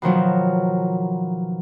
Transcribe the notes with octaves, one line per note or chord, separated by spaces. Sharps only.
B2 D#3 F3 F#3